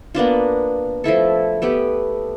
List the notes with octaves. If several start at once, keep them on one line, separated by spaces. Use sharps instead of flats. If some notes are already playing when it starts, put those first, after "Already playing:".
A#3 B3 D4 F4
F3 A3 E4 A4
A3 B3 G4